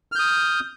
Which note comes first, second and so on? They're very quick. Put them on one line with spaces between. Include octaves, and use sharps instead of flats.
F6 G6 D#6